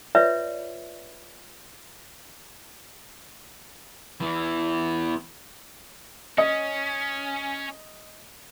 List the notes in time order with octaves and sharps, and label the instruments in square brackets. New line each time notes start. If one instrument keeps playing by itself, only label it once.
[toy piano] F4 B4 C#5 D5 E5
[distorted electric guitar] E2 E3
[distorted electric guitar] C#4 [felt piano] D#5